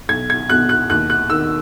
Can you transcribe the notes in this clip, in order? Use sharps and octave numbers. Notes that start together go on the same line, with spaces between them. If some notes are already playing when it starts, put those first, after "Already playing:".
B1 G#6
G#6
B2 F#6
F#6
D#2 F#6
F#6
D#3 E6